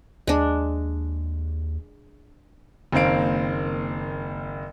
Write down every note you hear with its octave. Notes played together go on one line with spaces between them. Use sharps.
D#2 G#3 D4
F#1 D#3 A#3 C4 F5 D7